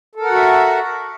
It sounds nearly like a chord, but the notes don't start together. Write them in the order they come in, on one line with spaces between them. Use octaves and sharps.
A4 A#4 F#5 F#4 E5